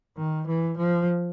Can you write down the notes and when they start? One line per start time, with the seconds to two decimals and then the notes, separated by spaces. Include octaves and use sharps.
0.18 D#3
0.47 E3
0.78 F3